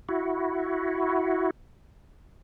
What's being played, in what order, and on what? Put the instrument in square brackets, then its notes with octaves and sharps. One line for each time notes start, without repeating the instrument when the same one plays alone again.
[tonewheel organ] E4 F#4